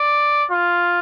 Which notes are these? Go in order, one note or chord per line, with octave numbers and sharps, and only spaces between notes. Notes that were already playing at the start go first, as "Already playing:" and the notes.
Already playing: D5
F4